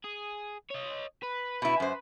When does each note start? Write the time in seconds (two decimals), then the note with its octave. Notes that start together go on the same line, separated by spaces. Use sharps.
0.04 G#4
0.71 C#5 D#5
1.23 B4
1.62 B2 E4
1.80 F#2 C5